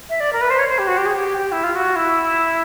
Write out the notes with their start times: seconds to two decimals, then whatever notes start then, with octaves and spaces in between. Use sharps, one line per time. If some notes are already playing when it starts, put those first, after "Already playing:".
0.09 E5
0.20 D5
0.33 A#4
0.41 B4
0.50 C5
0.59 C#5
0.69 C5
0.78 G4
0.88 F#4
0.98 G4
1.06 G#4
1.14 G4
1.38 G4
1.52 E4
1.64 F4
1.76 F#4
1.96 E4